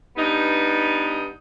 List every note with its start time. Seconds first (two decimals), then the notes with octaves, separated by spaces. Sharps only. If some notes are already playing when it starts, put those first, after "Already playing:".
0.17 G2 B3 D#4